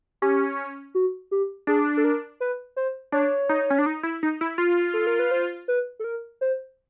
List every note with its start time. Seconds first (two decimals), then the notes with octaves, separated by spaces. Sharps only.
0.22 C#4 G4
0.95 F#4
1.31 G4
1.67 D4 G#4
1.97 A4
2.04 A#4
2.40 B4
2.77 C5
3.12 D4 C#5
3.49 D#4
3.70 C#4
3.79 D4
3.86 D#4
4.03 E4
4.23 D#4
4.41 E4
4.58 F4
4.94 A4
5.07 A#4
5.19 B4
5.31 C5
5.68 B4
6.00 A4
6.04 A#4
6.41 C5